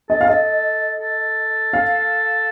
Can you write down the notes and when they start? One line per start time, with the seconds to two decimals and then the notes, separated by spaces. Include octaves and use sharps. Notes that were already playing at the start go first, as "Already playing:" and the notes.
0.09 A4 D#5
0.21 F5
0.27 A4 D#5
1.00 A4
1.73 F5